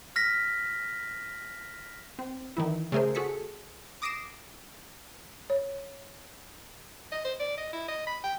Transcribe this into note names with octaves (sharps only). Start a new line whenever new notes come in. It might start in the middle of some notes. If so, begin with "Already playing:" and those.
F6 A#6 B6
C4
D#3 E3 E4
C#3 A3 G#4 A#4 C5
F#4 G#4 A4 B6 C#7
D6 D#6 A#6 C7 D7 E7
C#5
D#5
C5
D5
D#5
E4
D#5
B5
G5